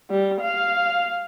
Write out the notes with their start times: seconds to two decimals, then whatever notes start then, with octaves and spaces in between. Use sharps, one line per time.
0.10 G3
0.41 F5